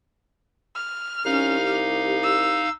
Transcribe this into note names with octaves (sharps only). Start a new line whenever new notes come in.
F6
C2 C#4 D#4 F5
G4
E6